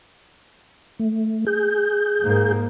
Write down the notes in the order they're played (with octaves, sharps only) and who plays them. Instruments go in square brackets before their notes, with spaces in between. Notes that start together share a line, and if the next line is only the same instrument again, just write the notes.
[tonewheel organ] A3
G#4 G6
[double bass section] G#2 A#3